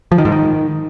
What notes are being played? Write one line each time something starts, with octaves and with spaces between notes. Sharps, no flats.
F3
D#3
G#2
D#3